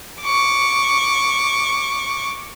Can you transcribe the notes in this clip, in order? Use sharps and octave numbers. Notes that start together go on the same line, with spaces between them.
C#6 D6